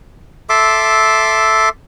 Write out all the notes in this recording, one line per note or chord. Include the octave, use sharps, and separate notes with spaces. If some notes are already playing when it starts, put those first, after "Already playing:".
A4 E5 C6 D6